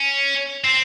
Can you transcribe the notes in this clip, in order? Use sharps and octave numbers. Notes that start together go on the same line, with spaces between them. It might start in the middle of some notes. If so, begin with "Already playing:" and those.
Already playing: C#4
C4